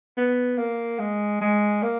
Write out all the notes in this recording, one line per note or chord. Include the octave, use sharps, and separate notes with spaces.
B3
A#3
G#3
G#3
A#3